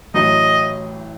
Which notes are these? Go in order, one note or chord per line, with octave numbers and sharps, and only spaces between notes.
A1 A2 F#3 D#5